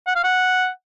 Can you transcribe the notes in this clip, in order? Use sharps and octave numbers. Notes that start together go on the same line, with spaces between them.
F#5
F5
F#5